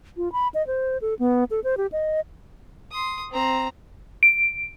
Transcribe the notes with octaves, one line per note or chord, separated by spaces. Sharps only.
F4
B5
D#5
C5
A4
B3
A4
C5
G4
D#5
C6 D#6
C4 A#5
D7